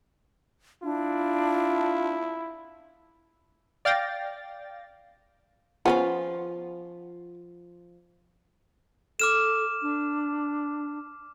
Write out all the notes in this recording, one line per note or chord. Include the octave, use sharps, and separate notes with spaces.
D4 E4 F4
D5 F5 G5 A6 A#6
F3 B3 C#4 F4 F5 B5
A4 D6 F6 E7
D4